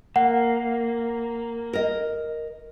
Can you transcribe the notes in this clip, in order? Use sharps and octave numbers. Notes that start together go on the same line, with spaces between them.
A#3 F#5
A#4 D#5